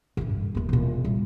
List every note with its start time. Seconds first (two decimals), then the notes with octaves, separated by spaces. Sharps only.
0.17 A2 D3
0.29 G2
0.55 D#2 A3
0.69 E1 A#2
1.04 G3 F4